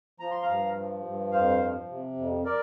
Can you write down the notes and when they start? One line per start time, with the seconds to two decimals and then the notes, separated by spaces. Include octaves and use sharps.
0.20 F3 A#5
0.31 C6
0.42 F5 A#5
0.48 G2
0.77 F3
1.04 G2
1.32 F2 C5 F5
1.61 F3
1.89 C3
2.17 F2
2.45 A#4 D5